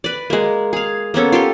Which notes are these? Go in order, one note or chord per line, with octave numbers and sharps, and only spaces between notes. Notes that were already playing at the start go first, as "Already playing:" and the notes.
B4 D5
G#3 A#3
G#4 F5
A#3 B3 C#4 A4
F4 G4 A4 C6